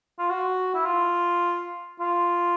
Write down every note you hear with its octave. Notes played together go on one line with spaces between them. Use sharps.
F4
F#4
E4
F4
F4